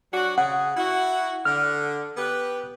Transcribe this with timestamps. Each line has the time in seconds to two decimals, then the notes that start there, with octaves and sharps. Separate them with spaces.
0.13 F#3 D4 F#4
0.38 C#3 G#4 F#5
0.76 E4 F#4
1.45 D3 F6
2.17 B3 G4 B4